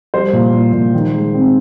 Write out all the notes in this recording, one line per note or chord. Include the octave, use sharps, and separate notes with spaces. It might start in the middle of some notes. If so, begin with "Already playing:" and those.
G3 C5
A#2
A#2
A#2
D#3
G#3
C4